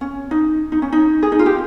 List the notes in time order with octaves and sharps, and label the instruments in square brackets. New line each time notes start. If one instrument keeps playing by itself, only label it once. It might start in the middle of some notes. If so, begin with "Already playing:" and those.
[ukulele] C#4
D#4
D#4
C#4
D#4
G#4
D#4
F4
G4